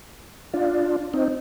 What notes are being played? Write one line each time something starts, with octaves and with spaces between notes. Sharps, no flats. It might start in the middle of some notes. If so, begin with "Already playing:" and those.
D4 F4
C4 D#4